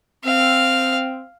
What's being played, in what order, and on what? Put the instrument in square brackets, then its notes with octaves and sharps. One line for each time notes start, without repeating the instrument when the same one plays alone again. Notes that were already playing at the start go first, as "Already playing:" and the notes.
[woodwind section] C4 [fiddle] F5